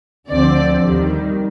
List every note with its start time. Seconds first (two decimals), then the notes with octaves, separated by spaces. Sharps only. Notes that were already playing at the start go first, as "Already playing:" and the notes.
0.30 D2 D3 F3 C4 D5
0.85 D#2 D#3 G3